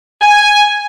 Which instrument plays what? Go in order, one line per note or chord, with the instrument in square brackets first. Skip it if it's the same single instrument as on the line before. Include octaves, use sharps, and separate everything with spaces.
[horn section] G#5